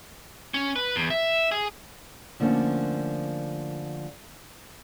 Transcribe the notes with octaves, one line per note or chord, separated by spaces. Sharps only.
C#4
B4
E2
E5
G#4
D3 F3 A3 A#3 C#4